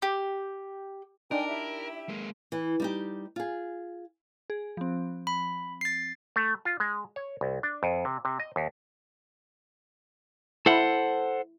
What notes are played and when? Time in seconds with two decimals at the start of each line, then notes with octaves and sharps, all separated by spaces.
0.02 G4
1.31 D4 D#4 A#4 G5 G#5
1.47 E4 G4 E5
2.09 G#3 A#3
2.52 E3
2.80 G3 D#4 G4
3.36 F4 G#4
4.50 G#4
4.77 F3 C4
5.27 B5
5.81 A6 C7
6.36 A3
6.65 F4
6.80 G#3
7.16 C#5
7.41 C2
7.63 D4
7.83 F2
8.05 C3
8.25 C3
8.40 D#5
8.56 D#2
10.66 E4 A4 C5 F#5